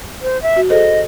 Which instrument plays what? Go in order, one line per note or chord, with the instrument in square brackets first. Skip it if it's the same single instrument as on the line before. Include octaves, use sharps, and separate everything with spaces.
[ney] C5
E5
[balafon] F#4
[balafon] G#4 A4 C5 [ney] D#5